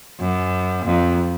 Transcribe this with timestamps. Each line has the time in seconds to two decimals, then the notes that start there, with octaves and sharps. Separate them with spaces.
0.20 F#2
0.86 F2